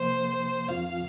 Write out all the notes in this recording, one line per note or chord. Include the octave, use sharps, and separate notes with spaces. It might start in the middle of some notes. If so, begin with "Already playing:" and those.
Already playing: C2 C3 F3 A#3 C5
F2 F3 C4 F4 F5